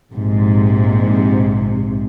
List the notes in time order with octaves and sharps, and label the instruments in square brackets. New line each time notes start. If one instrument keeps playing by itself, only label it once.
[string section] A#1 G#2 C3